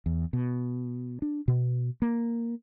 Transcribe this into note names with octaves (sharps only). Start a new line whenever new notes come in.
E2
B2
D4
B2
A#3